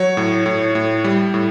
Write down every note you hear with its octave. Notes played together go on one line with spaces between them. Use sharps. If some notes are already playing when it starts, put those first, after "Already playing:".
Already playing: F#3 C#5
A2
A2
A2
G3
A2